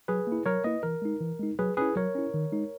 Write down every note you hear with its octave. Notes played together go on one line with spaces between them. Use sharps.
F#3 G#4 B4
A#3
E4
F#3 A#4 C#5
A#3 E4 B4 D#5
E3 A#4
G#3 D#4
E3
G#3 D#4
F#3 G#4 B4
C#4 E4 G#4 B4
F#3 A#4 C#5
C#4 E4
D#3
G#3 D#4